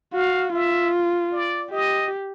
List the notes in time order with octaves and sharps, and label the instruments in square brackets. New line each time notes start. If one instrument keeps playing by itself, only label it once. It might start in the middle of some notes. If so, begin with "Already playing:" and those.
[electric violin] F#4 [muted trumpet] F5
[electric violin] F4 [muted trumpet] E5
[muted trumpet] D5
[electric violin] G4 [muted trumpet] D#5